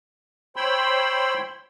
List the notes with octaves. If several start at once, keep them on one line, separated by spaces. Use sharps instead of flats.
C5 C#5 G5 B5 C6 E6